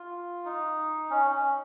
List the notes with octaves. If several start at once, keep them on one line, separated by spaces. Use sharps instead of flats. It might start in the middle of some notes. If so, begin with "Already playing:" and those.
Already playing: F4
D#4
C#4
C#4